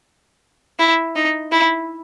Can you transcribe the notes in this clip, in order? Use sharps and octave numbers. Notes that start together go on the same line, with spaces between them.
E4
D#4
E4